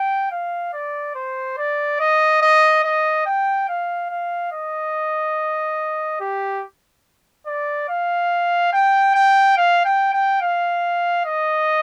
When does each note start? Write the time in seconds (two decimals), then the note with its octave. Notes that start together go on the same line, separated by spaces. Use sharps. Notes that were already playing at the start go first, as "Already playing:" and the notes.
Already playing: G5
0.32 F5
0.74 D5
1.15 C5
1.58 D5
2.00 D#5
2.42 D#5
2.84 D#5
3.26 G5
3.69 F5
4.10 F5
4.52 D#5
6.20 G4
7.47 D5
7.89 F5
8.73 G5
9.15 G5
9.57 F5
9.85 G5
10.13 G5
10.42 F5
11.25 D#5